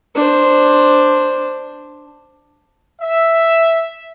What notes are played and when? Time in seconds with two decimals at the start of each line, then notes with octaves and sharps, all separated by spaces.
0.15 D4 C5
3.01 E5